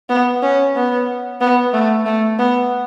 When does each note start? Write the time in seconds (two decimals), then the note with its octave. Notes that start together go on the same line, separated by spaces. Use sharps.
0.09 B3
0.42 C#4
0.76 B3
1.41 B3
1.73 A3
2.06 A3
2.39 B3